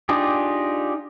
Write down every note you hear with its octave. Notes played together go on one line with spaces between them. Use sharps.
D4 D#4 F4 G4 G#4